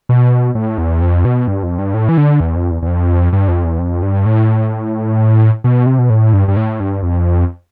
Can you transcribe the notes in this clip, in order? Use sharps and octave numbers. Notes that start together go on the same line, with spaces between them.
B2
A2
E2
F2
B2
G2
F2
G2
A2
E3
D3
E2
F2
E2
E2
F2
G2
F2
E2
F2
G2
A2
B2
C3
B2
A2
G2
G2
A2
G2
F2